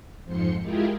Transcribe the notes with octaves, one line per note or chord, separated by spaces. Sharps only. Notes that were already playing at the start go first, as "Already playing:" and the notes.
F2 G#2 F3 C6 C#7
G#3 E4 F4 G4 G#4 A#4